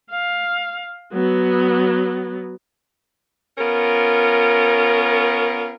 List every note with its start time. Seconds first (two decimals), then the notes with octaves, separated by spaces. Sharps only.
0.11 F5
1.13 F#3 B3
3.58 B3 C#4 F4 A#4